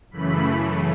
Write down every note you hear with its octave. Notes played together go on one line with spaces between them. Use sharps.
F#2 C#3 E3 A3 B5